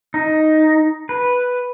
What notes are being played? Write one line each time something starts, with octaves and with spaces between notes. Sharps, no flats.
D#4
B4